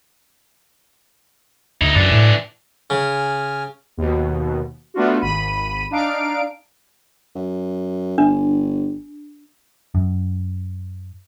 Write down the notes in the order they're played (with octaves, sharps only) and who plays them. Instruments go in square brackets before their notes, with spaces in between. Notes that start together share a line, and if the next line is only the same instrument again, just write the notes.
[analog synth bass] D2 [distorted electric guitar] D#4 E4
[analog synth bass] F#2 [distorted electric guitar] E3 D4
[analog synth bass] A2
[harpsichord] C#3 [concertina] G#5 F6
[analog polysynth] D#2 B2
A3 B3 D4 F4 F#4
G#1 B5 D#7
D4 D#4 F5 D7
[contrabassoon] F#2
[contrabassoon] G1 [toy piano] D4
[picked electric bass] F#2